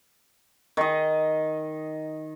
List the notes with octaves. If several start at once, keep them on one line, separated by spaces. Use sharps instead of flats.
D#3 D#5